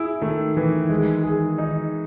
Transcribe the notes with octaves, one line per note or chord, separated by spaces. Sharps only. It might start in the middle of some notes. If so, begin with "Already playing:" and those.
Already playing: E4 G#4
D#3 A3
E3
G#3
G#4
D#4